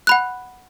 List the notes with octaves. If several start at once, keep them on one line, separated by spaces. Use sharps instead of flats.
F#5 B5 F#6